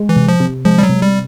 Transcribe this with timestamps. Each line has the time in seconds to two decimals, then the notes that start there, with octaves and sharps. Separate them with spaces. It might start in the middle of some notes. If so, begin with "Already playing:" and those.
Already playing: G#3
0.09 E3
0.16 C3
0.29 F3
0.40 C3
0.65 F3 G#3
0.78 G3
0.83 F#3
0.89 C3
1.02 G3